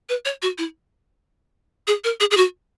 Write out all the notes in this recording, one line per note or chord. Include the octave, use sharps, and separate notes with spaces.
B4
C#5
F#4
E4
G#4
A#4
G#4
G#4
F#4